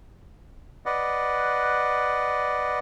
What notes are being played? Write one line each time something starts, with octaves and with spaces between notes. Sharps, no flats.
B4 D5 D#5 F#5